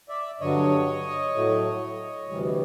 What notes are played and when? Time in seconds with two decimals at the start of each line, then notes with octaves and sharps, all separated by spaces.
0.09 D5 E5
0.41 G2 D3 F#3 C#5 D#5
1.34 A2 F#3 A3
2.28 D2 C3 E3 G3